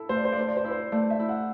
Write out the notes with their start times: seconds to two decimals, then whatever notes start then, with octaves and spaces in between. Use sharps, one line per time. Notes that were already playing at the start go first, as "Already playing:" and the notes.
Already playing: E4 A4
0.09 A3 C5
0.17 D5
0.25 C5
0.32 D5
0.37 A3 C5
0.48 D5
0.57 C5
0.64 E4 D5
0.71 C5
0.92 A3 D5
1.10 E5
1.19 E4
1.29 F#5